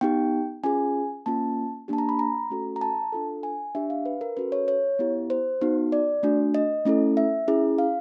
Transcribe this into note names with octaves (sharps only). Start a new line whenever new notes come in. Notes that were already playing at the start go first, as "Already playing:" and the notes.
B3 D#4 G4 G5
C#4 F4 G#4 G#5
A#3 C#4 F4 A5
A#3 D4 G4 A5
A#5
B5
A#5
A3 C#4 F#4 A4
A#5
A5
D4 F4 A4
G#5
D4 G4 E5
F5
B4
A#4
C#4 F#4 A4 B4
C#5
C#5
B3 E4 G4
C5
B3 D#4 F#4
D5
A3 D4 F#4
D#5
A3 C#4 E4 A4
E5
C#4 E4 G#4
F5